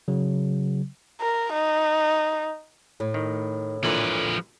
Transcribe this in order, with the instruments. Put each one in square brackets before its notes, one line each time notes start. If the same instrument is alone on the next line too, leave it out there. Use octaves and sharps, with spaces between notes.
[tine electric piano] C#3 F#3
[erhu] A#4
D#4
[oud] A2
[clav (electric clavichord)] D#3
[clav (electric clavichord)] A#2 D3 E3 [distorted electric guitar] F3 B4